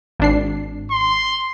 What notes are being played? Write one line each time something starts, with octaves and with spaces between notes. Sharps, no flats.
G#1 D4 C7
C6